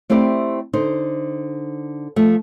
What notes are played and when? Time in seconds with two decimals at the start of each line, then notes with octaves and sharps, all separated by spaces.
0.10 A3 C4 E4 G4 D5
0.73 D3 D#4 C5
2.16 F3 A3